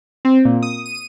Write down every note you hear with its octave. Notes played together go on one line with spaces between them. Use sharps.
C4
A#2
D#6
D#7